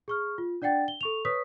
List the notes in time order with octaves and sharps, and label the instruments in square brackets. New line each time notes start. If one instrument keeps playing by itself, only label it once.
[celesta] G#4 C#6 F6
F4
D4 D5 F#5 G5 A6
G7
A4 C#6 F7
B4 C#5 C#6 D#6 B6